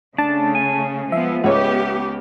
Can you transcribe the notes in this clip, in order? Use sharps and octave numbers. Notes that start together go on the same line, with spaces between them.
C#3 A3 D4 A5
G#5
F3 G#3 B3 E5
C#2 B3 G4 C#5